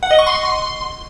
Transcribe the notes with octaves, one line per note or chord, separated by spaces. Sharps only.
F#5
D#5
C#6
C6